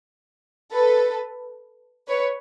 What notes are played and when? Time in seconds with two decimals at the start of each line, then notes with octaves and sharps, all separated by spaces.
0.72 A4 B4
2.08 B4 C#5